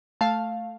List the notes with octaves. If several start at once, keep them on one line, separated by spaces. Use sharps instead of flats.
A3 F5 A5